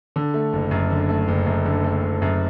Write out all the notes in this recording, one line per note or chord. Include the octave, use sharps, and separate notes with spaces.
D3
A3
F#1
F#2
D3
A3
F#1
F#2
D3
A3
F#1
F#2